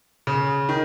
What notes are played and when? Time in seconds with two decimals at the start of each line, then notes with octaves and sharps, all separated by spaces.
0.27 C#3
0.69 D#3